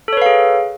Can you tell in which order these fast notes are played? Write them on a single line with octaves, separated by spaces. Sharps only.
A4 C#5 B4 F5 G#4